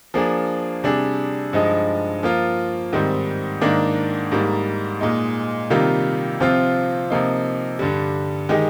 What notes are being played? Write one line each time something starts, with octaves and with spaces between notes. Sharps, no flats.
F3 A#3 D4 G#4
C3 G3 D4 G#4
G2 F3 G#3 D#4
F3 A#3 F4
G#2 D#3 G3 C4
G#2 D#3 A#3 D4
G#2 G3 A#3
A#2 G#3 D#4
C3 D#3 G3 A#3 F4
C3 F3 C4 F4
C3 F3 A#3 D#4
G2 D3 G3
D#3 G#3 D#4 G4